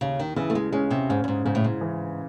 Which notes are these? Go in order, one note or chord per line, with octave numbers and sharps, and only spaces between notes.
D#2 C#3
D#3
C#3 E3
A3
G#3
G#3 C#4
C3
G#2 C#4
F#2
G#2
G#2 C#3
A2
G#2
E3